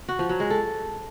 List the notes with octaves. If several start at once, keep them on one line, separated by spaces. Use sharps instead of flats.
F#4
F3
F#3
G#3
A4